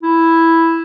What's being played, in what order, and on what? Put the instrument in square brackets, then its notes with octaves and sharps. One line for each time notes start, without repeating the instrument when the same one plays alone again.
[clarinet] E4